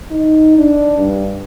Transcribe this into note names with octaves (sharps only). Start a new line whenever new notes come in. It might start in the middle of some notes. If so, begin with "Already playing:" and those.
D#4
D4
G2